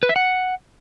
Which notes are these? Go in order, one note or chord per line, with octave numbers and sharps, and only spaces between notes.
B4
E5
F#5